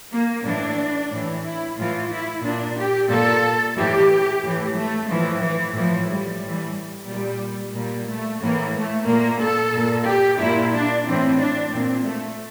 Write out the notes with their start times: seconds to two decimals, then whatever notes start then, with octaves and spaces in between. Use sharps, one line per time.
0.13 A#3
0.46 A2 E3 D4
1.12 A2 E3
1.45 E4
1.79 A2 E3 F4
2.12 E4
2.45 A#2 D4
2.78 G4
3.11 A#2 A4
3.78 A2 E3 G4
4.44 A2 E3
4.78 A3
5.10 A2 E3 F3
5.43 E3
5.76 A2 E3 F3
6.10 G3
6.43 A2 E3
7.09 A#2 G3
7.76 A#2 G3
8.09 A3
8.42 A2 E3 A#3
8.76 A3
9.08 A#2 A#3
9.42 A4
9.75 A#2
10.08 G4
10.41 A#2 E4
10.75 D4
11.08 A2 E3 C4
11.41 D4
11.74 A#2 C4
12.07 A3